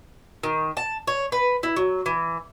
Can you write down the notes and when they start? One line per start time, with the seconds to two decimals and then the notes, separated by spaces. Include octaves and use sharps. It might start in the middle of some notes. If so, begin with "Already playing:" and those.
0.43 D#3
0.77 A5
1.07 C#5
1.32 B4
1.63 E4
1.76 F#3
2.06 E3